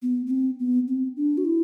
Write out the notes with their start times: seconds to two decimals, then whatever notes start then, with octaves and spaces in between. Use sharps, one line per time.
0.02 B3
0.26 B3
0.30 C4
0.60 B3
0.88 C4
1.16 D4
1.38 F#4
1.45 E4